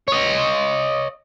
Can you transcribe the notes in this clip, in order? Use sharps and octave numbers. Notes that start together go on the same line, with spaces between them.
C#5 D#5